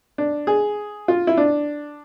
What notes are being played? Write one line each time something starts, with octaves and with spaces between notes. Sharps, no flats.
D4
G#4
F4
E4
D4